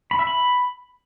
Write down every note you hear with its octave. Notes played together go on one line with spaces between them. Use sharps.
B5
E5
B5